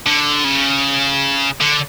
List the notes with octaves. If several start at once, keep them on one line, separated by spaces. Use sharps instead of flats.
D3
C#3
D3